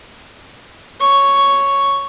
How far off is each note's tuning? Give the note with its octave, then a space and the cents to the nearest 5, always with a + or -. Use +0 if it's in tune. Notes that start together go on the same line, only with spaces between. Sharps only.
C#5 +0 C#6 +0